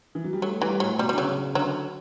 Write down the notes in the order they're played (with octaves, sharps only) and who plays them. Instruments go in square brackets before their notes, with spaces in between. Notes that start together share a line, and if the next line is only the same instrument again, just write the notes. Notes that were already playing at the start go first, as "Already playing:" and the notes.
[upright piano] E3
F#3
G3
[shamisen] F#3 [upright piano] A3
[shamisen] E3 [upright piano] G3
[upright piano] A2 [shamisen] F#3
[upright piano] B2 [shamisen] G3
[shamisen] G3
[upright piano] D3
[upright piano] C#3 [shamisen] F#3
[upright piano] D3 [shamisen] F#3